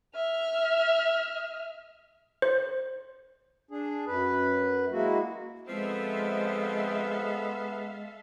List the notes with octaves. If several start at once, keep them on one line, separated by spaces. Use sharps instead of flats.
E5 F6
C5
D4 G#4
F#2 B4
G#3 A#3 E4 F#4
F3 G#3 B3 C4 A4 E5 F5